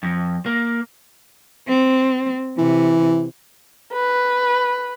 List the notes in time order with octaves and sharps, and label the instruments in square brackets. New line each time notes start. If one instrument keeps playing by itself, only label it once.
[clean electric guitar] F2
A#3
[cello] C4
[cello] C3 [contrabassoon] E3
[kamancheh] B4